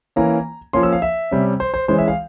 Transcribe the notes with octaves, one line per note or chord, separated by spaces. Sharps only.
E3 A#3 C#4 A#5
F3 A#3 C#4 C6
E6
F5
E5
C3 G3 C#4
C5
C5
E3 G#3 C#4 C5
E5
F5